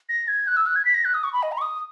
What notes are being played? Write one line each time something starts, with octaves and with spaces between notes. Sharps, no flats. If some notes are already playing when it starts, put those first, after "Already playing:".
A#6
G#6
F#6
E6
F#6
G#6
B6
A#6
F#6
D#6
C#6
B5
D#5
A#5
C#6
D#6